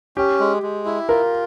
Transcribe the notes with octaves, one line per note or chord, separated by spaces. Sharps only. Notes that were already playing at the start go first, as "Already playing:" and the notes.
C#4 G4
G#3
G#3
E4
F4 A#4